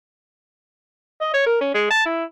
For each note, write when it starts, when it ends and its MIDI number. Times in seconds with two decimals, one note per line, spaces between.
1.21 1.29 75
1.34 1.42 73
1.46 1.60 70
1.61 1.74 61
1.75 1.88 56
1.91 2.05 81
2.06 2.24 64